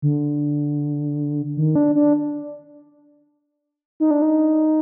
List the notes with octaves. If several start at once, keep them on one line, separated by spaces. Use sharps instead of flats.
D3
D#3
D4
D4
D#4
D4
D#4